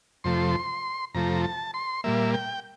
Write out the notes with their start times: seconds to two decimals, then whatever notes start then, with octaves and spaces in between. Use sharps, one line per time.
0.24 F2 C3 F3 A3 C6
1.14 F2 C3 F3 A3 A#5
1.44 A5
1.74 C6
2.04 A#2 G3 A#3 E5
2.34 G5